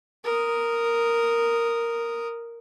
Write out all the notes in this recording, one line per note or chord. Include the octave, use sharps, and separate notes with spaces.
A#4 D#6